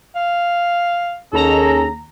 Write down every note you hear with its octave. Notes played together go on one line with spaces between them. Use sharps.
F5
D#2 C#4 G#4 A4 A#5